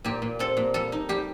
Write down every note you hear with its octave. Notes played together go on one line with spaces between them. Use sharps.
A#2 G4
A#2
C4 A4
A#2
G3 A4
D#4
G3 G4